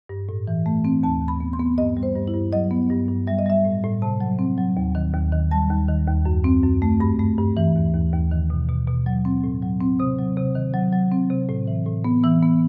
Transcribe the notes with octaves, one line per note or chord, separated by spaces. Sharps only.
G2
A2
E3
A3
C4
D#2 A5
D#2
B5
B3
C6
B3
G2 D#5
G3
C5
G2
E4
G2
F#3 D#5
B3
G2
G2
G3 E5
D#5
G3 E5
A2
A2
C3 A5
F#3
C4
F#3
D#2
D#3
D#2
D#3
G3 A5
D#2
D#3
D#2
F#2
C4
F#2
A3
G2 B5
A3
G2
E3
D#2
D#2
D#2
D#3
B2
B2
B2
F#3
C4
A2
F#3
C4
C3 D#6
F#3
C3
D#3
F#3
F#3
C4
C3
A2
E3
A2
B3
E3 E6
B3